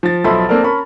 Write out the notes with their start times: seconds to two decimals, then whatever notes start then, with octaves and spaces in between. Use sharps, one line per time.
0.03 F3 A6
0.24 B1 F3 A4 E5 B5 C6
0.49 A#3 C4 D4 A4 A#4
0.64 C#4 A#4 A5 B5 C#6